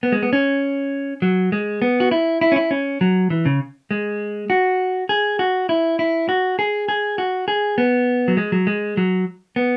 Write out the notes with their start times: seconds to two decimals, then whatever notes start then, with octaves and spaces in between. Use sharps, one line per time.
0.03 B3
0.12 G#3
0.23 B3
0.33 C#4
1.22 F#3
1.52 G#3
1.82 B3
2.00 F#4
2.11 E4
2.41 E4
2.52 C#4
2.56 E4
2.71 C#4
3.01 F#3
3.30 E3
3.46 C#3
3.91 G#3
4.50 F#4
5.09 G#4
5.39 F#4
5.69 E4
5.99 E4
6.29 F#4
6.59 G#4
6.88 G#4
7.18 F#4
7.48 G#4
7.78 B3
8.28 F#3
8.37 G#3
8.52 F#3
8.67 G#3
8.97 F#3
9.56 B3